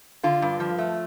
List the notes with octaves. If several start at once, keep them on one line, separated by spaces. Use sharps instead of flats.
D3 F4
G2
F3
A3